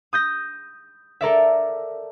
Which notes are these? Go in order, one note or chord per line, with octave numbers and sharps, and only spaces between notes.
D#6 G6 A#6
A4 A#4 D5 E5